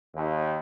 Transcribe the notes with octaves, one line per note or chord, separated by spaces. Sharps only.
D#2